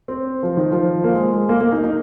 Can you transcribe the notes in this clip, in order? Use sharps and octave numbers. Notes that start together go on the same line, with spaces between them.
C4
F3
D#3
F3
A#3
G#3
G#3
A#3
A#3
D#4
D#4